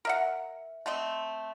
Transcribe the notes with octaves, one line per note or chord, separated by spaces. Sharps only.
A#4 E5 F#5
A3 C4 D#5